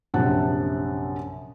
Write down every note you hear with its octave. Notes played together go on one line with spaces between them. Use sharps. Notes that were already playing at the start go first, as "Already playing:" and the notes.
A#1 F#2 C3 F#5 A5 F#6